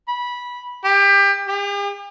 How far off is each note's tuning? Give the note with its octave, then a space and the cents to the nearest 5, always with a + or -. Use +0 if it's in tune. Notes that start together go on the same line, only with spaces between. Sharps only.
B5 -15
G4 +25
G4 +45